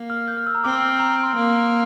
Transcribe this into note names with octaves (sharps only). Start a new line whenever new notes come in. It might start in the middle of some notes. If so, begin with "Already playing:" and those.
Already playing: A#3
F6
G6
F6
E6
A#5
C4 D6
E6
F6
E6
A#5
C6
A#3